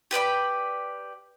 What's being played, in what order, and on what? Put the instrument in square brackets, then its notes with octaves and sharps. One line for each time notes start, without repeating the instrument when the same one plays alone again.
[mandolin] G4 B4 D5 B5